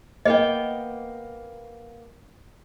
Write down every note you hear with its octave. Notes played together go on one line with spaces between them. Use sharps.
A#3 B3 D#5 G5